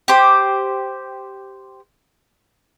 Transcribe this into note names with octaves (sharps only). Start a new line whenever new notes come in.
G4 C5